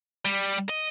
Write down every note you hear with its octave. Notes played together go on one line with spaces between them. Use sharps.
G3
D#5